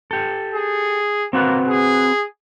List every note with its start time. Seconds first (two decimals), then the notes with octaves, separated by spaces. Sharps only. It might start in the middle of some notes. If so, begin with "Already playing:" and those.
0.11 G4 A4
0.54 G#4
1.33 A#3 C4 F#4 B4
1.68 G#4